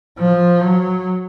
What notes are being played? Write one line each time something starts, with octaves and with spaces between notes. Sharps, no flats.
F3
F#3